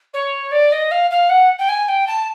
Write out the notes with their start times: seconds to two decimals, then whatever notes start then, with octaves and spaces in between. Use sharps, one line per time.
0.13 C#5
0.51 D5
0.72 D#5
0.91 F5
1.10 F5
1.29 F#5
1.58 G5
1.68 G#5
1.88 G5
2.07 A5